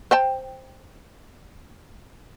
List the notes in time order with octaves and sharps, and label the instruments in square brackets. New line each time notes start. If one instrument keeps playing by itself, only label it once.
[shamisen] C5 G5 A5